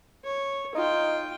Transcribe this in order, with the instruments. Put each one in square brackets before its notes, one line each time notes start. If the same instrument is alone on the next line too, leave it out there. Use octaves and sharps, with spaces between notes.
[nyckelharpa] C#5
[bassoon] D#4 [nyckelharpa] F4 G5